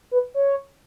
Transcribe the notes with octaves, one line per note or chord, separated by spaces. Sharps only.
B4
C#5